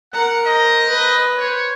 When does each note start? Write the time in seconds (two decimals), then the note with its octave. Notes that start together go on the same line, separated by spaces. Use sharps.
0.14 A#4 F#5 A#5
0.46 C5 D#5
0.89 B4
1.38 C5 C#5